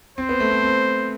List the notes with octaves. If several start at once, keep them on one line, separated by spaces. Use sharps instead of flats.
C4 C5
B3
A3
C4
C4